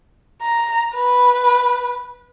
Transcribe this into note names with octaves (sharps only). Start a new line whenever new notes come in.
A#5
B4